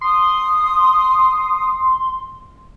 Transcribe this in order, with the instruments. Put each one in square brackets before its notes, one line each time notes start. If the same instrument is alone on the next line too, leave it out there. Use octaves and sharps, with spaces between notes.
[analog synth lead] C6 [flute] D#6